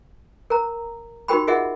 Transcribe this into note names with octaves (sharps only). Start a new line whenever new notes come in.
A#4 A#5
D#4 F#4 G4 A#4 G5 B5
F4 G#4 A#4 D#5 E5 F#5